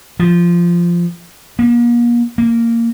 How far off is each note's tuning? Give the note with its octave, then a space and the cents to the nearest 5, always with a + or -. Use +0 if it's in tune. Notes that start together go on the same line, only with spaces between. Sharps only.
F3 -10
A#3 +40
A#3 -10